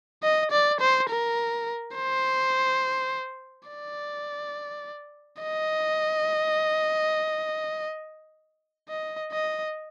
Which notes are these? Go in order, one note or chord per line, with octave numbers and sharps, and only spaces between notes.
D#5
D5
C5
A#4
C5
D5
D#5
D#5
D#5